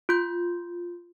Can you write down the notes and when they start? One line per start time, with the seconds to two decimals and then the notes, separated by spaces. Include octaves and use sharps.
0.09 F4 C6 G6